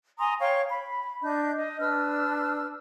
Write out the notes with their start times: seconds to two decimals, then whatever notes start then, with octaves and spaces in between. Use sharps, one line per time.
0.18 G#5 A#5 C6 D#6
0.40 C#5 F5 G5 C#6
0.70 B5
1.22 D4 D#5 G6
1.55 D#5
1.80 D4 B4 E6 F6